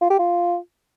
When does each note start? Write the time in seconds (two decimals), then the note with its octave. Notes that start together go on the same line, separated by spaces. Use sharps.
0.01 F4
0.10 G4
0.19 F4